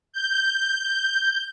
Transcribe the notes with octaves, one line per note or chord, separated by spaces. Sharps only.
G6